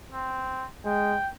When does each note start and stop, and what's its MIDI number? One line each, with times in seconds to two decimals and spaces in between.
0.12 0.65 60
0.85 1.18 56
0.85 1.28 79